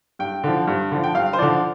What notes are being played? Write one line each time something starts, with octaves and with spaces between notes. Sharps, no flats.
G2 G5
D3 F3
G2
D3 F3
G5
G2 F5
C5
D3 F3 D5